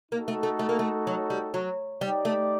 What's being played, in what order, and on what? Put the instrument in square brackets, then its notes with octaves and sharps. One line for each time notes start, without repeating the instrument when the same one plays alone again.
[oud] A#3 [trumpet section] D#4 F#4 A4
[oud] A3
A3
A3
A#3
A3
F#3
G3
F#3
[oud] G3 [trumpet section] D#4 G4 D5
[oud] A3